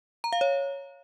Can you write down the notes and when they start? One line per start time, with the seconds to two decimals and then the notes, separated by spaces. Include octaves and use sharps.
0.24 A#5
0.33 F5
0.41 C#5